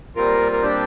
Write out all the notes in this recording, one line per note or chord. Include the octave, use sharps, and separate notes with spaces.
A#2 G3 C4 F4 A#4
A#4
D4 G4